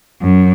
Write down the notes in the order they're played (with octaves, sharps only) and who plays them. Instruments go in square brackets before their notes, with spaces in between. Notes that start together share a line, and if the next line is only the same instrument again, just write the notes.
[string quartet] F#2